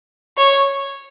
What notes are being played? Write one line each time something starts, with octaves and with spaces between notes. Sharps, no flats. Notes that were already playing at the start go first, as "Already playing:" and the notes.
C#5